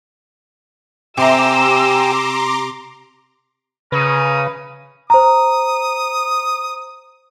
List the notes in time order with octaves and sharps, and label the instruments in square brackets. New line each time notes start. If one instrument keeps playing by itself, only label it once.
[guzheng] C3 [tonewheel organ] G4 G5 G#5 [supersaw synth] A#5 C6 D6 [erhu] E6
[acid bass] C#3 [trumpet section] C#4 A#4 D#6 [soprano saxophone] B4
[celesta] C5 A#5 [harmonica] D#6